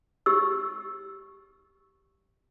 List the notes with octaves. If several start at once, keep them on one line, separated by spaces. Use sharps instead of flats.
G4 E6